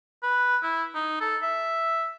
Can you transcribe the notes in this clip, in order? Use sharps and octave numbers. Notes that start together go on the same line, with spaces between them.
B4
E4
D#4
A4
E5